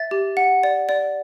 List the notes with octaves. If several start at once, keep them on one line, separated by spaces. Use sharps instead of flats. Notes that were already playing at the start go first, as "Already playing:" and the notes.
Already playing: E5 A6
G4
F#5
D5
D5